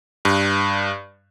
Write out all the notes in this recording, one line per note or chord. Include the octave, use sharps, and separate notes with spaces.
G2